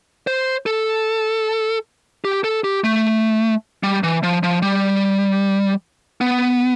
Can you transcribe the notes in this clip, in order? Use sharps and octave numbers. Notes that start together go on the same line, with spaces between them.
C5
A4
G4
A4
G4
A3
G3
E3
F3
F3
G3
B3